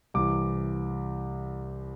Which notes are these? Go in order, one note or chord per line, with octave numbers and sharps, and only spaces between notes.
C2 C3 E3 D6